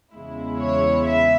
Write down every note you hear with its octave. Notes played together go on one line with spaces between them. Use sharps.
E2 C#3 G#3 E4
C#5
E5